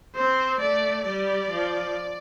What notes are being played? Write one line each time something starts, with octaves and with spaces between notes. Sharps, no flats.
C4 C5
A3 D5
G3 D5
F3